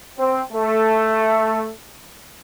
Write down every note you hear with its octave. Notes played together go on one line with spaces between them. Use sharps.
C4
A3